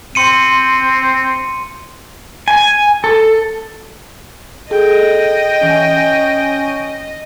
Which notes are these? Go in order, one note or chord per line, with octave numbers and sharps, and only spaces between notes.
C4 C6 C#7 D#7
G#5
A4
G#4 A4 D#5 G5
E3 C#4